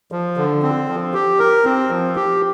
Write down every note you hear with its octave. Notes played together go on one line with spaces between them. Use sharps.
F3
D3
C4
F3
G4
A#4
C4
F3
G4